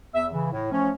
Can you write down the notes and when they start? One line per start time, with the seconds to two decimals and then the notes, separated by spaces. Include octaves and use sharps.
0.12 E2 E5
0.32 C#3 E3
0.52 A2
0.71 F3 A3 C#4